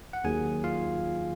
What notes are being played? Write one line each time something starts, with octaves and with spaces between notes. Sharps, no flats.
F#5
D#2 D#3 F#3 G#4 G#5
F4 F5